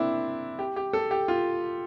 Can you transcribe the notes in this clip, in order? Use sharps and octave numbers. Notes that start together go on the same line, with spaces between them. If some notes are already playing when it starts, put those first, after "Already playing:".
Already playing: A#3 C4 D4 E4
G4
G4
A4
G4
F4